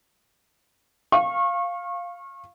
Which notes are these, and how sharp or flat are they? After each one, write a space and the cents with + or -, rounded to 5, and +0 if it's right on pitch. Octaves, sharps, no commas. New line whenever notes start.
F5 +0 C#6 -30